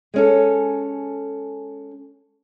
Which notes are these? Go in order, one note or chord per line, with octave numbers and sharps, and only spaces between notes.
G#3 C#4 A4